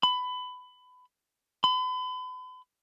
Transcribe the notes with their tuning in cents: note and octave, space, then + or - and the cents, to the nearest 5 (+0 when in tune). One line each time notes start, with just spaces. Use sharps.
B5 +20
B5 +40